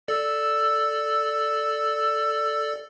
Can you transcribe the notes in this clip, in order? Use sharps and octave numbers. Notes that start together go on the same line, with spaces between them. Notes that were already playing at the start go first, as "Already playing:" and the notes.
A4 D5 E6